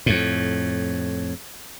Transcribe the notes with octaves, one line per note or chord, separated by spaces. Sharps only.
F2 A2